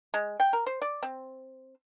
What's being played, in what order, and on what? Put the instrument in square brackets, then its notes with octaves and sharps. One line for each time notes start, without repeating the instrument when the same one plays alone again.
[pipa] G#3
G5
A#4
C5
D5
C4